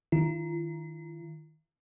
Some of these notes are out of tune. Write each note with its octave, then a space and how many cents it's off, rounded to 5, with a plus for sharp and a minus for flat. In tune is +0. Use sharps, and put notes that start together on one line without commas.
D#3 +5 F4 -45